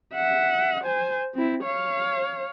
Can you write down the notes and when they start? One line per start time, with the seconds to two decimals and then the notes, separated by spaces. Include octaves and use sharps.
0.14 E5 F#5
0.84 C5 G#5
1.34 C4 E4
1.63 C#5 F5